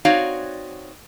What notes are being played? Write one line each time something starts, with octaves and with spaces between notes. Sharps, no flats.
C4 D#4 F#4 C#5 D5 F5